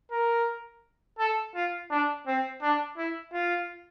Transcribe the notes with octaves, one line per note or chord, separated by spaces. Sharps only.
A#4
A4
F4
D4
C4
D4
E4
F4